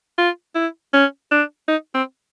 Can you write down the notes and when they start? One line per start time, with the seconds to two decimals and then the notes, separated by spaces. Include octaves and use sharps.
0.18 F4
0.56 E4
0.94 C#4
1.32 D4
1.68 D#4
1.95 C4